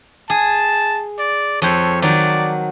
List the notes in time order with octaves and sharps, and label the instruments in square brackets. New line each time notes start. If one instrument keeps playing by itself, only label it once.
[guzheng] G#4 [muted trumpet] A5
[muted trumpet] D5
[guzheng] F2 A4 C5 [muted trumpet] C#5
[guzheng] D#3 F#3 [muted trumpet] D5